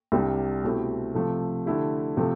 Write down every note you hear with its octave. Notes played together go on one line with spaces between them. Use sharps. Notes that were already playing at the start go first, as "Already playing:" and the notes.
C2 C3 G3 D4 G4
B2 A3 C4 E4 G4
C3 F3 A3
D3 A3 E4 G4
C3 F3 A3